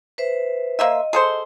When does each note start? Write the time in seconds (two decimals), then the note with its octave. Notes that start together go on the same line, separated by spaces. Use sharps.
0.18 B4 C5 E5
0.79 A#3 C5 D#5 E5
1.13 G#4 A4 C5